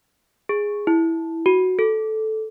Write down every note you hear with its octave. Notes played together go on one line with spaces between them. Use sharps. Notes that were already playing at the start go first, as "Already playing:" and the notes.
G#4
E4
F#4
A4